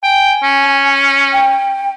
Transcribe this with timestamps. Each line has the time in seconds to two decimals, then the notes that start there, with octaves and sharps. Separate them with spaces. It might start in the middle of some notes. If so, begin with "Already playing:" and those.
0.03 G5 G#5
0.43 C#4
1.33 G5